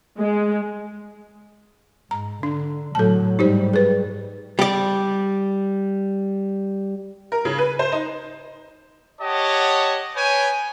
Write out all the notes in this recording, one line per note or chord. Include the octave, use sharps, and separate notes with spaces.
G#3
G#2 A#5
D3 D4
A2 F#3 A4 A5
G#2 G3 D#4 G4 C5
G#4 B4
G3 D5
A#4
C#3
B4
C5
D#4
G4 C#5 D#5 F#5 A5
B4 C#5 G5 G#5